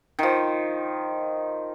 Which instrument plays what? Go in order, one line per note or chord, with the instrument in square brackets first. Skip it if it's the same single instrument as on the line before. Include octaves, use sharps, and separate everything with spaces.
[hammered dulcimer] D#3 F3